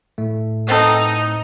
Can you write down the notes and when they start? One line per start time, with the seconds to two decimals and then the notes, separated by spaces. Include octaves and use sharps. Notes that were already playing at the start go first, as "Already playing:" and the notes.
0.18 A2 A3
0.69 B3 C4 D#4 A4